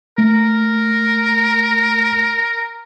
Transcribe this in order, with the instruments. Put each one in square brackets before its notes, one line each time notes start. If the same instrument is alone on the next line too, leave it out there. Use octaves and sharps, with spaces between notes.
[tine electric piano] A3 [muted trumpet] A#4